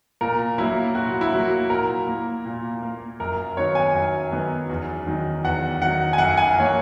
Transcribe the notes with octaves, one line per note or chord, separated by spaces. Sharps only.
A#2 A#4
F#3 A#3 E4
A#2 F#4
E4
F#3 A#3 F#4
A#2 A#4
A#3
A#2
A#3
F#2 A#4
D#3 F#3 B3 C#5
G#5
F#2
D#3 F#3 B3
E2
D#3 F#3
E2 F#5
D#3 F#3 F#5
G#5
F#2 F#5
G#5
E3 A#3 C#5